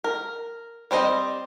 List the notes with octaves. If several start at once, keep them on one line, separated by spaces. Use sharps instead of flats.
A#4
G3 C4 C5 D#5